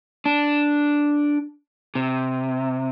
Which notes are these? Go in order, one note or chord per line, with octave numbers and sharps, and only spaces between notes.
D4
C3